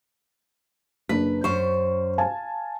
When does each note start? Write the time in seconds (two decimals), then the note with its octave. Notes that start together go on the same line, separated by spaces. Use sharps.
1.09 F#1 D4 B4 B6
1.44 F#2 C5 C#6
2.18 F5 G#5 A5